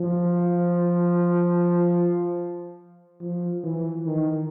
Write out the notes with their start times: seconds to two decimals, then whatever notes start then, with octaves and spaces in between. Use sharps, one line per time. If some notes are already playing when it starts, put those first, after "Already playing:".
Already playing: F3
3.21 F3
3.64 E3
4.06 D#3